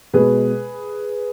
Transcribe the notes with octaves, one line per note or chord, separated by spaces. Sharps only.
B2 G#3 G#4 B4